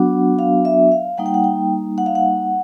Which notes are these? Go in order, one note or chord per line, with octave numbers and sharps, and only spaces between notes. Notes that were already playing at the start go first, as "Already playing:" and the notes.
Already playing: F#3 B3 D4 F#4 F#5
F5
E5
F5
G3 A#3 D#4 F#5
G5
F#5
G5
F#5
F5
F#5